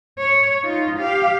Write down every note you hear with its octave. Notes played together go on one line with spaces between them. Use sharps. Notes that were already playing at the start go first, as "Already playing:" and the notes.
C#5
D#4 F4
G4 F5